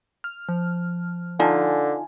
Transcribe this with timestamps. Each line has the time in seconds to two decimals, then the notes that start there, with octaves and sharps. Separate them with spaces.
0.24 F6
0.49 F3
1.40 D3 D#4 F4 G#5 A5